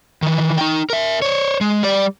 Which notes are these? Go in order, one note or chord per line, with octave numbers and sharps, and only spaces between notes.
D#3 E3
D#4 G5
A#4 E5
C5 C#5
G#3
G3 D5